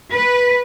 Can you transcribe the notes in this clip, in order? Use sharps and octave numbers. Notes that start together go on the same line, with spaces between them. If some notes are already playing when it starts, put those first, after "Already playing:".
B4